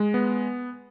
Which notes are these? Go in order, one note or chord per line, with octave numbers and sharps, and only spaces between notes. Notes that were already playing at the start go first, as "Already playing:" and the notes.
Already playing: G#3
B3